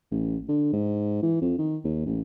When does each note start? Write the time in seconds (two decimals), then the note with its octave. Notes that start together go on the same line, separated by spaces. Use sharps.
0.11 A1
0.48 D3
0.73 G#2
1.23 E3
1.42 F2
1.58 D#3
1.84 D#2
2.06 A1